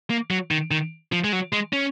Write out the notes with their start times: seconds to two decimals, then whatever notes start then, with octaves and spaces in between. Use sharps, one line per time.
0.10 A#3
0.31 F#3
0.51 D#3
0.71 D#3
1.12 F3
1.24 G#3
1.33 F#3
1.53 G#3
1.73 C#4